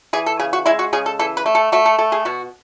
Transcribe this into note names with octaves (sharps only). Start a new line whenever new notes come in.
E3 G#4
A4
C#3 G#4
F#4
G#3 E4
F#4
C#3 G#4
A4
E3 A4
B4
A3
A4
A3 F#4
A4
A3 A4
G#4
B2 F#4